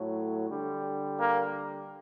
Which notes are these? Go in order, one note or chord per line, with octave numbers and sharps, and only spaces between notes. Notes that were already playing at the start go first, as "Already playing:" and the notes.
Already playing: A2 F#3 A3
D3 G3
A#3